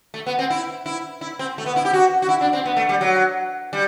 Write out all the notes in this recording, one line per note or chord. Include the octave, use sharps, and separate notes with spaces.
A3
B3
C4
E4
E4
E4
C4
A3
B3
E4
G4
F#4
F#4
E4
D4
C4
B3
A3
G3
F#3
G3